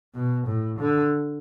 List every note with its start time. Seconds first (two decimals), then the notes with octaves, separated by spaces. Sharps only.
0.15 B2
0.47 A2
0.79 D3